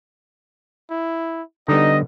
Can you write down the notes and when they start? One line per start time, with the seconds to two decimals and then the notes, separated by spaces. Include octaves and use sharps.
0.90 E4
1.68 D3 G3 B3 D#4 D#5